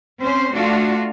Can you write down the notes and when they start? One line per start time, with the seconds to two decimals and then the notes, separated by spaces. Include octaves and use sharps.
0.20 C4 C#4 C5
0.55 A3 D4 F4 F#4